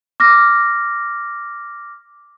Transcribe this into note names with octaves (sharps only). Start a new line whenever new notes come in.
D6 F6 A#6